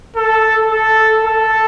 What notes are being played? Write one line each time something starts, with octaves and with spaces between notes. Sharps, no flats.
A4
A4
A4